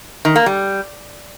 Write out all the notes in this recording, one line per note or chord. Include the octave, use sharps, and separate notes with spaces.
D#3
A#3
G3